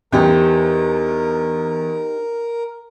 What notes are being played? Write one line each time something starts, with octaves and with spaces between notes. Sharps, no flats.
E2 D#4 G4 A#4 C5